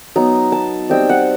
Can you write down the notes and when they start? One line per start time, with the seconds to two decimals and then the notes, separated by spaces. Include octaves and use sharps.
0.16 F#3 B3 D#4 A#5
0.52 A5
0.90 G3 C4 D#4 G5
1.09 F#5